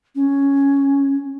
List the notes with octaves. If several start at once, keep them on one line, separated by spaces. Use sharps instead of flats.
C#4